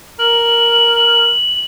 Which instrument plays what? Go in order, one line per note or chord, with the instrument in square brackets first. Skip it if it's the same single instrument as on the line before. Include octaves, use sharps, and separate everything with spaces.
[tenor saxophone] A#4 [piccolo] F#7